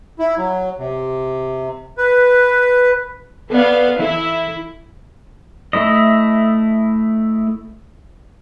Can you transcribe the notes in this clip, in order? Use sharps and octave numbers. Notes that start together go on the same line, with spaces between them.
E4
F#3
C3
B4
B3 A4 D5 F5
E3 E4 A4
A3 E4 D#5